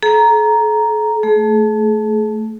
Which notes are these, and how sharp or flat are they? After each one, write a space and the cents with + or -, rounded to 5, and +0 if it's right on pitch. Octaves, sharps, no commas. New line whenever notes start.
A4 -45 A#5 +0
A3 +0 G#4 +35